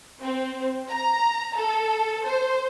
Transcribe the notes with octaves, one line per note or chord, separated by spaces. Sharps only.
C4
A#5
A4
C5